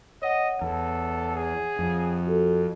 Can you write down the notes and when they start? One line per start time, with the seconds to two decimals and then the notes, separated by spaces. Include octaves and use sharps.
0.22 C#5 D#5 F#5
0.62 E2 A4
1.36 G#4
1.79 F2
2.27 F#4 A4